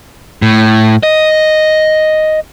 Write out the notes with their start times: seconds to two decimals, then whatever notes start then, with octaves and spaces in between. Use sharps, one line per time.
0.42 A2
1.03 D#5